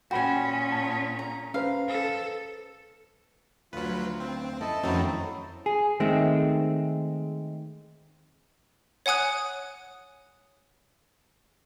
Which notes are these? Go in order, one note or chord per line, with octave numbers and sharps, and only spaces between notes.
A#2 C#4 F#4 G5 G#5 B5
A5
A#5
C#4 B4 C5 F5
A4
D2 F#3 F4 B4
C4
E4 A4 D#5 A5
F2 D#3 F3 F#3 A3 C4 C#4 E4
G#4
D#3 G#3 A3 C4
C#5 F#5 G#5 D#6 F#6